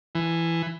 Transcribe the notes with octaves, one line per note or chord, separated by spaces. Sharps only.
E3